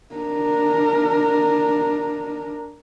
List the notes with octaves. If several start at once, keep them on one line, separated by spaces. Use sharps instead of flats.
D4 A#4